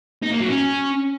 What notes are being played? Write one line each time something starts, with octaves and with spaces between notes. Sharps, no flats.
D#4
A#3
F#3
C#4